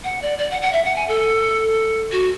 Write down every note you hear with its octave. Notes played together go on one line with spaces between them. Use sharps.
F#5
D5
D5
F#5
F#5
E5
F#5
G#5
A4
F#4